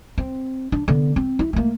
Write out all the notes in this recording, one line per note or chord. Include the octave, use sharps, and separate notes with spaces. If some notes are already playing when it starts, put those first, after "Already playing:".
C4
D4
D3 B3
C4
E4
A3 A#3